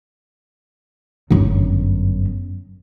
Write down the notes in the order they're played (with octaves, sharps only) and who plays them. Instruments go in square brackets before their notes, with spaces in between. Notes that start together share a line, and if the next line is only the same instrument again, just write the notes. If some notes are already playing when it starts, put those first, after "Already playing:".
[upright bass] G1 F#2